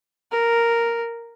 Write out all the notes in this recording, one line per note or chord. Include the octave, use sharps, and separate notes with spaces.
A#4